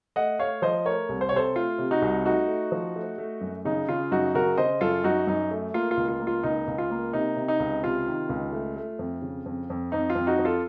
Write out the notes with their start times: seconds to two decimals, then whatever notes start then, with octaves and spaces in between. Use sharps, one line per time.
0.16 A3 D#5 F#5
0.39 A3 C#5 F5
0.62 F3 C5 D#5
0.85 A3 A#4 C#5
1.09 C2
1.21 C5
1.29 C#5
1.33 C3 A4 C5
1.56 A3 F4
1.78 C3
1.91 D#4 F#4
2.02 C2
2.25 A3 D#4 F#4
2.48 A3
2.72 F3
2.96 A3
3.18 A3
3.41 F#2
3.65 C#3 D#4
3.88 C#3 F4
4.11 F#2 D#4 F#4
4.34 C#3 F#4 A#4
4.58 C#3 C5 D#5
4.81 F#2 F4 A4
5.04 F#2 D#4 F#4
5.27 F#2 D#4
5.51 A3
5.74 A#3 F4
5.91 F4
5.97 C#2
6.09 F4
6.20 A#3
6.27 F4
6.43 C#2 D#4
6.68 C#2
6.78 F4
6.91 A#3
7.13 C3 D#4
7.37 C3
7.48 D#4
7.60 C#2
7.83 C3 F4
8.07 D#3
8.29 C#2
8.52 A3
8.76 A3
8.99 F2
9.22 C#3
9.46 F2
9.70 F2
9.92 F2 D#4
10.10 F4
10.15 F2
10.27 D#4 F#4
10.39 F2
10.45 F4 A4